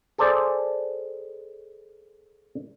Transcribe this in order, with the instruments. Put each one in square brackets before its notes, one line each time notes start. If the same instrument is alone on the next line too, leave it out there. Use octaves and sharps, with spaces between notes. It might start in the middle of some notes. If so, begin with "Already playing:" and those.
[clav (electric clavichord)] G#4 A4 C5 D5